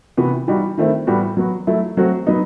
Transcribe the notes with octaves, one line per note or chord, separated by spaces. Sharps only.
C3 E3 B3 F#4
E3 G3 D#4 F#4
D#3 A3 C4 E4
A2 E3 G3 B3 F#4
F#3 B3 F#4
F#3 A3 E4
F#3 A3 C4 F#4
F#3 B3 D#4